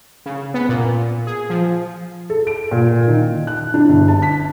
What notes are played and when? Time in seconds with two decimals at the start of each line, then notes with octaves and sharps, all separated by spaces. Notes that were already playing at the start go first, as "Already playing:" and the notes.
0.26 C#3
0.54 B3
0.69 A#2
1.27 G#4
1.50 F3
2.30 A4
2.47 D7
2.71 A#2
3.08 D#3
3.47 F#6
3.74 D4
3.88 G1
4.08 A5
4.22 B6